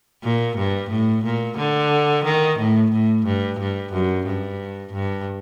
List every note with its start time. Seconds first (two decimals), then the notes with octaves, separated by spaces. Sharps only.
0.23 A#2
0.58 G2
0.90 A2
1.25 A#2
1.58 D3
2.25 D#3
2.59 A2
2.91 A2
3.26 G2
3.60 G2
3.93 F#2
4.27 G2
4.93 G2